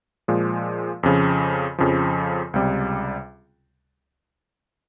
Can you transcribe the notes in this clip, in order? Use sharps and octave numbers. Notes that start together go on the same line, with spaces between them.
A#2 F3 G#3
F2 C#3 F3
F2 C#3 F3
C#2 C3 G3